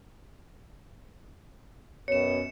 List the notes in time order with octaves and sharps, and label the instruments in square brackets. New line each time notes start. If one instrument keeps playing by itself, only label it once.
[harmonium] F#2 [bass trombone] B2 [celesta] C#5 [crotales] C#7 E7